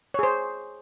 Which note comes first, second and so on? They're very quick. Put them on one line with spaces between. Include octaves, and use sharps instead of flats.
C#5 G#4 C5